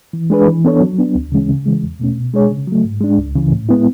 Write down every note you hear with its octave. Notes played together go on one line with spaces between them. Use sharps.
E3
G#3 D4 G#4 B4
E3
B3 D4 A4 C#5
F#3
B3 D4
D2
C#3 E3 G#3 C#4
C#3
E3 G#3
E2
B2 A3 C#4
B2
G#3 D4 G#4 C#5
C#3
F#3 A3
G#2
G#3 D4
C#2
C#3 E3
A2
G#3 B3 E4